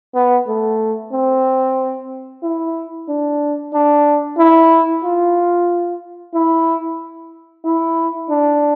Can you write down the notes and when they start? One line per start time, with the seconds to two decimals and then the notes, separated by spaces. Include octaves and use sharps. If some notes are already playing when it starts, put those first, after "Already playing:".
0.15 B3
0.48 A3
1.13 C4
2.43 E4
3.09 D4
3.73 D4
4.38 E4
5.04 F4
6.34 E4
7.65 E4
8.30 D4